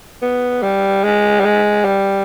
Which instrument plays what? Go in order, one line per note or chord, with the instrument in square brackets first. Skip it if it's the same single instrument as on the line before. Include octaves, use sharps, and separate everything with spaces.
[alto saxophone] B3
G3
G#3
G3
G#3
G3